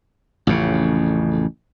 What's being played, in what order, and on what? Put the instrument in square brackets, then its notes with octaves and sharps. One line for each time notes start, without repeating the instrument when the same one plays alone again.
[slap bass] A1 F2 C#3